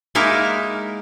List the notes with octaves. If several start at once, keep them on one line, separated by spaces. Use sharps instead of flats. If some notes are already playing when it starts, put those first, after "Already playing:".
G#3 A#3 D#4 E4 A#4